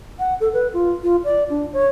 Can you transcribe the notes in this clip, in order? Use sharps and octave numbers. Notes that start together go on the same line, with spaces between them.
F#5
A4
B4
F4
F4
D5
D4
C#5